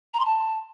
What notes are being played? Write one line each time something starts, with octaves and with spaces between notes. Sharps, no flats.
A#5
C6
A5